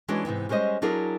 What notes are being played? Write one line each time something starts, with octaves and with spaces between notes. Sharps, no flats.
E3 G#3 C#4 D4 F#4 D5
G#2 C3 E3 B3
G3 G#3 C#4 C5 D#5
F#3 D4 E4 G#4 A#4